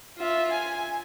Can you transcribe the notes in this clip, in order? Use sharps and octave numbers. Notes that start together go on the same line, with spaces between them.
F4 E5
G#5